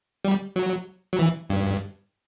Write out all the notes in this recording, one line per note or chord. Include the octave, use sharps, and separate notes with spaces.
G3
F#3
F#3
E3
G2